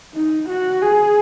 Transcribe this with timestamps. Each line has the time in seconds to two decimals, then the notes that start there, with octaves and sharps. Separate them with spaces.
0.14 D#4
0.49 F#4
0.83 G#4